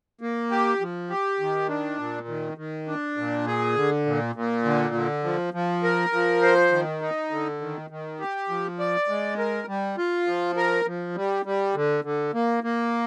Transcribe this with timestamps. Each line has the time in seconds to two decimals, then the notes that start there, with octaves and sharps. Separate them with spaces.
0.21 A#3
0.51 G4
0.81 F3
1.10 G4
1.40 D#3
1.69 D4
1.99 A#2
2.28 D#3
2.57 D#3
2.87 D4
3.17 A#2
3.47 G#4
3.76 D3
4.06 A#2
4.35 A#2
4.65 D3
4.95 D3
5.24 F3
5.54 F3
5.83 A#4
6.13 F3
6.42 C5
6.72 D#3
7.02 D#4
7.31 D3
7.61 D#3
7.90 D#3
8.20 G4
8.49 F3
8.79 D5
9.09 G#3
9.38 A#4
9.68 G3
9.98 F4
10.27 F3
10.57 A#4
10.86 F3
11.16 G3
11.46 G3
11.75 D3
12.04 D3
12.34 A#3
12.64 A#3